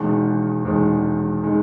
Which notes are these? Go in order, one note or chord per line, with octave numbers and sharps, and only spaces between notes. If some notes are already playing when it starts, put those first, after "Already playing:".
Already playing: E1 E2 D#3 G#3
E1 E2 D#3 G#3
D#3 G#3